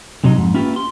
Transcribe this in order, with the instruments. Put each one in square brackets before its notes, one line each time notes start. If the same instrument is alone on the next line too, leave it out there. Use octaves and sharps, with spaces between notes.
[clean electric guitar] C3 F#3 D#4
F2 G#2
A#3 C#4 E4 F4 G4 B4
C6